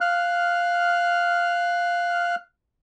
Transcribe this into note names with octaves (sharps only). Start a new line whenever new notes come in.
F5 F6 F#6